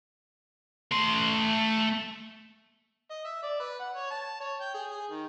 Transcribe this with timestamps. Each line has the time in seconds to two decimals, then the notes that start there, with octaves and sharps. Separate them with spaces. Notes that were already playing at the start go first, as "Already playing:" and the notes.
0.91 A3 C6
3.10 D#5
3.25 E5
3.43 D5
3.60 B4
3.80 F#5
3.96 C#5
4.10 A5
4.40 C#5
4.61 G5
4.74 G#4
4.91 G#4
5.10 D#3